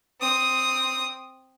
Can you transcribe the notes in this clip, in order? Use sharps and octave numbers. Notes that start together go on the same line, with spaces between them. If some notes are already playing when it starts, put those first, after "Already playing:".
C4 D#6